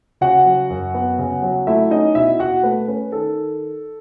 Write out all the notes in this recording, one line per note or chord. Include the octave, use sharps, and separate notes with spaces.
C#3 F#4 F#5
F#3
F#2
B3
C#3
F#3
A3 E4 E5
C#4 D#4 D#5
B2 E4 E5
B2 F#4 F#5
A3 B4
C#4 B4
D#3 A4